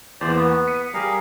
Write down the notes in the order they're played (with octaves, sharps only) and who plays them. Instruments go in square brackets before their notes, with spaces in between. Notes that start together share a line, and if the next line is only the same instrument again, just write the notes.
[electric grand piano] E2 E3 A#3 [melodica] C5 D5
[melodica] B3
[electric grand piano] C#6
B6 C#7 D#7
[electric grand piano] G3 G4 [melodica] G#4 A#4 F5